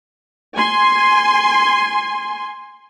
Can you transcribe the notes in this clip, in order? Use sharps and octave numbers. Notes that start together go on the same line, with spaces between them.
G#5 C6